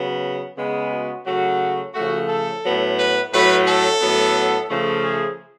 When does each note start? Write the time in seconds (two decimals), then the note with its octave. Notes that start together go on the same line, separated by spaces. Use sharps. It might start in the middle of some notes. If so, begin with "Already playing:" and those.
Already playing: C#3 F#3 B3
0.57 C#3 G#3 B3
0.92 F#4
1.26 C#3 F#3 A3 F#4
1.94 C#3 F3 A3 F#4
2.29 A4
2.64 A2 F#3 B3
2.98 B4
3.32 A2 F#3 A3 B4
3.67 A4
4.02 A2 F#3 B3
4.70 C#3 F3 A3
5.04 G#4